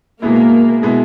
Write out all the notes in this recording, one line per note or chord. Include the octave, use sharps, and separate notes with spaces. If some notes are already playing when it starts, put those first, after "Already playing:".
B2 G#3 A#3 B3 E4
B2 G#3 B3 E4